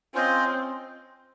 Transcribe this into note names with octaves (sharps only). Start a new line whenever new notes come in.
C4 C#4 F4 C5 D#5